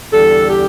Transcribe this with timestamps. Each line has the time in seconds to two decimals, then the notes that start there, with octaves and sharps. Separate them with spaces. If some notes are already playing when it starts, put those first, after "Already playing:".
0.13 E2 D3 G3 A4
0.49 G4